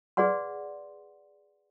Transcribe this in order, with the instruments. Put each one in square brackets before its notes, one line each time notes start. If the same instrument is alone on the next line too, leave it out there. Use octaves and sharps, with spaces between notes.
[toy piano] G#4 B4 D5 F#5 C6